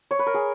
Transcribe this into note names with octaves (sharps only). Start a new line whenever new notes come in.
C#5
B4
A#4
G#4